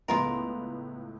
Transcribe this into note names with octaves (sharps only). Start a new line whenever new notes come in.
C#2 A2 G#3 B3 F4 A#4